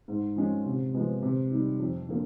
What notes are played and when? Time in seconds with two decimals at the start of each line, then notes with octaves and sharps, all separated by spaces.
0.08 G#2
0.36 F3 G#3 C#4
0.66 C3
0.93 F3 G#3 B3
1.22 C3
1.51 D#3 G3
1.79 F2
2.09 D3 F3 A#3